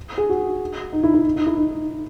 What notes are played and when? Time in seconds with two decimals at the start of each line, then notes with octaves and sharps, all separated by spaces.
0.18 G#4
0.29 F#4
0.93 D#4
1.03 E4
1.14 E4
1.25 D#4
1.36 D#4
1.46 E4
1.58 D#4